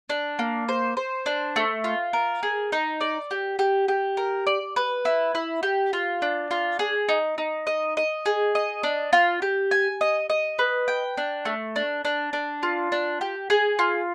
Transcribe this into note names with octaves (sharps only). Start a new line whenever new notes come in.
D4
A#3
C5
C5
D4
A3
F4
A#4
G#4
D#4
D5
G4
G4
G4
A#4
D5
B4
E4
E4
G4
F4
D4
F4
G#4
D#4
D#4
D#5
D#5
G#4
D#5
D4
F4
G4
G#5
D#5
D#5
B4
G5
D4
A3
D4
D4
D4
F4
D4
G4
G#4
F4